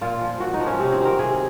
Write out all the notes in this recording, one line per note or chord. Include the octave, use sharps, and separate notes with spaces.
A#2 F4
F3
A#2 F#4
D#4
F3
C#4
C3 C4
C4
D#3 F#3
A#4
C3 G#4